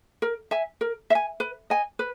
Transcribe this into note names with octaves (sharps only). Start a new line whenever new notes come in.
A#4
E5 G#5
A#4
E5
G#5
B4
D#5 G#5
B4